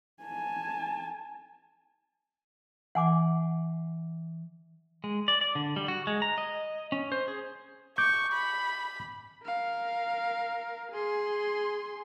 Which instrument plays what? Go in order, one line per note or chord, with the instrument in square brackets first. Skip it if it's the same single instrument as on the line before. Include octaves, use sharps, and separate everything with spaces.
[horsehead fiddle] G#5 A5
[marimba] E3 [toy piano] F#5 G#5 D6
[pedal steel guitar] G#3
D5
D5
D3
G3
F#4
G#3
A#5
D#5
C#4
C5
G#4
[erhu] C#6 [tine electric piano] D6 G6
[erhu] B5
[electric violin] A#4 F5
G#4 C6